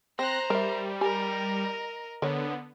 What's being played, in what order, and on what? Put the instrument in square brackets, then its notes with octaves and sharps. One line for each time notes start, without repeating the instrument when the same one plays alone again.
[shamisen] C4 [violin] C5 A#5 [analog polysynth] F#6 A#6
[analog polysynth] G3 [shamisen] A#4 E5
[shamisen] G4 G#5 [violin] A#4 D#5
[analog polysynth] D3 B3 [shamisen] A#4 C#5